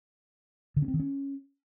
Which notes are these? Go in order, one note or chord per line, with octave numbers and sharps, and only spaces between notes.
D3
C#4
C4
D#3
C#4